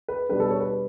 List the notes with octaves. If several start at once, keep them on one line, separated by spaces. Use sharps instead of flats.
B4
B2 G3 D4 B4
A4
C#5
B4